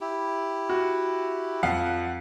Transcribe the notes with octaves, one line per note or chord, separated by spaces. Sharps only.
E4 G4
F#4
F2 F5 F#5 C7